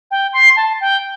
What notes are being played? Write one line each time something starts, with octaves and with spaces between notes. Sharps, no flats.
G5
C6
A5
G5